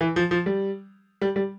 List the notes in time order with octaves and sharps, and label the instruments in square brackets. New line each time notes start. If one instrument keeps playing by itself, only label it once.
[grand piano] E3
F3
F3
G3
G3
G3